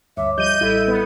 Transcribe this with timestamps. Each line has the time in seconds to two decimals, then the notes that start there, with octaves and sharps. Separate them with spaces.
0.17 D2 G2 C#5 E5 D6
0.38 F3 G3 D#5 G6 D#7
0.61 A1 G3 E4 A4 G#6
0.88 B3